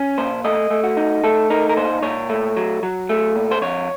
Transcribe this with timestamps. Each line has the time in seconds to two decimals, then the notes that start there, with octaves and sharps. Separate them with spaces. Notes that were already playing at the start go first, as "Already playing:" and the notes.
Already playing: C#4
0.18 A#2 C5
0.44 A3 D#5
0.70 A3
0.84 F#4
0.97 D#4
1.24 A3 A4
1.50 D#4 A#4
1.69 A#4
1.77 A#2 C5
2.03 A#2 C#5
2.30 A3
2.57 F#3
2.83 F#3
3.09 A3
3.35 A#2
3.51 C5
3.61 F2 C#5